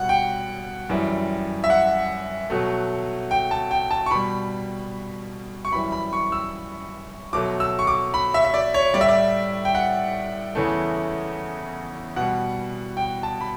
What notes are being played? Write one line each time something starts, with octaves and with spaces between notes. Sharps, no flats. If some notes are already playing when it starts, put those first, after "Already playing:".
Already playing: B2 G3 F#5
G5
F#2 E3 G3
E5
F#5
B2 F#3 A3
G5
A5
G5
A5
C#6
B2 G3 B5
C#6
F#2 E3 G3 B5
B5
C#6
E6
B2 F#3 A3 D6
E6
C#6
D6
B5
E5
E5
D5
C#5
A2 G3 D5
E5
D5
G5
F#5
E2 C#3 E3 A3
B2 G3 F#5
G5
A5
B5